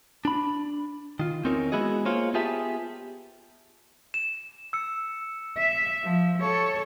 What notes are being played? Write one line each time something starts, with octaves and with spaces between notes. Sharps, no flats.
D4 B5
D#3 F4
E2 C4 C#4 D#4 A#4
G#3 B3 E4 F#4 G#4 D#5
A#3 F4 G#4 C5 C#5 F5
B3 F4 G4 G#4 E5 A5
E7
E6 C#7
E5
F3
A4 C#5